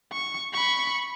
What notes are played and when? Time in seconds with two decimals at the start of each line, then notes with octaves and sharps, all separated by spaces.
0.12 C#6
0.53 B5 C#6